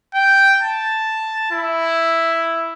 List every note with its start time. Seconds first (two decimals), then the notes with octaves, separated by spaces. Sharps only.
0.15 G5
0.62 A5
1.52 E4